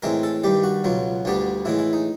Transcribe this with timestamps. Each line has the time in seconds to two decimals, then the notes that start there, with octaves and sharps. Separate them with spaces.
0.02 A2 E3 G#3 C4 A#4
0.23 A4
0.44 G2 D#3 G3 G4
0.63 F#4
0.84 C#2 B2 F#3 F4
1.25 D2 D3 G3 B3 D4
1.65 A2 E3 G#3 E4
1.79 E4
1.93 D#4